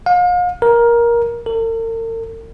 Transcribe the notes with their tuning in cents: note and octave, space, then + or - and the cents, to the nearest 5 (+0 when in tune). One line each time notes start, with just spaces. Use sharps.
F5 +40
A#4 +15
A#4 -45